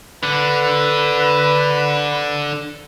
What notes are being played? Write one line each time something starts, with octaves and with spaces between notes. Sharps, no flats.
D3 B4